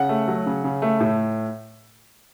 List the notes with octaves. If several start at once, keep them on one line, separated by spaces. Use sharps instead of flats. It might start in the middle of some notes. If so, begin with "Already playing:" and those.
Already playing: C#3 F#5
A3
F#3
C#3
C#3
A3
A2